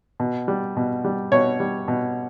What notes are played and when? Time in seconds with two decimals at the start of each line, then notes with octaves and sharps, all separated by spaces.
0.20 B2
0.48 G3
0.77 B2
1.05 G3
1.32 B2 C#5
1.60 G3
1.88 B2